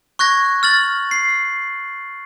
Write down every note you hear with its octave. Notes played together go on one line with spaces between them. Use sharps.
C#6 F#6 G#6 A#6
F6 A6 F#7
C7